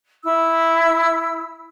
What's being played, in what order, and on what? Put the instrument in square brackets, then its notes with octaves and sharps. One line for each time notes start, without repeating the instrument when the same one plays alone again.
[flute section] E4 E6